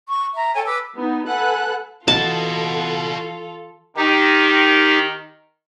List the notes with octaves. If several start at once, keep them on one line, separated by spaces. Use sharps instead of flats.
C#6
E5 A#5
A4 C#5 G5 G#5
B4 D6 E6
B3 D#4
A4 B4 F#5 G#5 F#6
E3 F4 F#4 A4 D#5 A5
D#3 D#4 G4